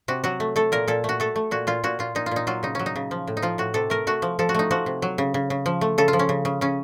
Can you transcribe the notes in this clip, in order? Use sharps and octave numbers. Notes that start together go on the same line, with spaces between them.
C3 F#4
F#3 F#4
A3
A3 A4
A#2 A#4
A#2 A4
A3 F#4
A3 A4
A3
A#2 F#4
A#2 F4
A#2 F#4
A#2 F4
A#2 D#4
F4
A#2 D#4
F#3 F4
C#3 D#4
F#3 C#4
D#4
C#3
F3
A2
D#4
F3 F4
A2 F#4
C3 A4
A3 A#4
A3 F#4
F3
F3 A4
F#4
A3 D#4
F3 F#4
C3
F#3
C#3
C#3
C#3
F3
A3
C#3 A4
F4
F3
C#4
C#3
C#3
C#3 C#4